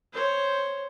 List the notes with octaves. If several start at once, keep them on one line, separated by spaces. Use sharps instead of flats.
C5 C#5